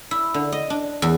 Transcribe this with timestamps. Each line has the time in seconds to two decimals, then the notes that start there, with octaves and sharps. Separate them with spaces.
0.11 E4
0.34 D3
0.52 D#5
0.70 D4
1.02 E2